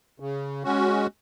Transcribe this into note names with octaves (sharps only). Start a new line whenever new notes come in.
C#3
G#3 C#4 F#4